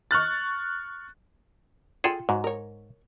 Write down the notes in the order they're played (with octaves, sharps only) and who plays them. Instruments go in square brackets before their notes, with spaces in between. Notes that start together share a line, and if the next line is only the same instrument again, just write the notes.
[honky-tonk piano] C#6 F6 F#6 A6
[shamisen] F4 G5 [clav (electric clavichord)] G#4 A4
[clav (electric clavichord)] G#2 [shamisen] F#3
[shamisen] A#4 C#5